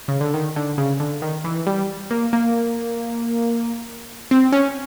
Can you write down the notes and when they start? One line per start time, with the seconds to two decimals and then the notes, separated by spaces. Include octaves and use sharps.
0.08 C#3
0.21 D3
0.34 D#3
0.56 D3
0.78 C#3
1.00 D3
1.22 D#3
1.44 E3
1.67 G3
2.11 A#3
2.33 A#3
4.31 C4
4.52 C#4